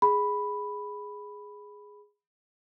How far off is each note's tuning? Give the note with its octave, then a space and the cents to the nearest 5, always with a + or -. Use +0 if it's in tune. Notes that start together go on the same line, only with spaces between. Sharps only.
G#4 +0 B5 +0